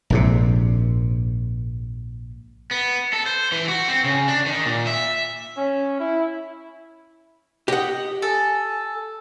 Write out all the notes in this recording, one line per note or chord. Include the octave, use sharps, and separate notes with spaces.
A#1 G#2 C3
B3
A4
C5
E3
F#4
C4
C#3
D4
D#3
A#2
E5
C#4
E4
G4 D#5 F#5
A4 G#5